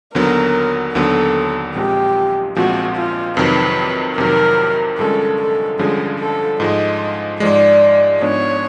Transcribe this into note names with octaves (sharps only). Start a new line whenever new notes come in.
D#2 D3 F#3 B3 A#4
D#2 D3 F#3 B3 A4
A#1 A#2 F3 G#3 C4 G4
A#1 A#2 F3 G#3 C4 F#4
F4
F2 C3 D#3 F#3 B4
F2 C3 D#3 F#3 A#4
G2 D3 F3 G#3 C#4 A4
A4
G2 D3 F3 G#3 C#4 G#4
A4
G#2 F3 G#3 D#5
G#2 F3 G#3 D5
G#2 F3 G#3 B3 D4 C#5